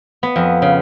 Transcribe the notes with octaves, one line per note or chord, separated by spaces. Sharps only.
B3
F2
C#3